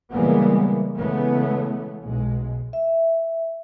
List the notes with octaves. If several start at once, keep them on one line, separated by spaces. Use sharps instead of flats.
C#3 E3 G3 G#3 A#3 B3
C#3 E3 G#3 A3 B3
B1 G#3
E5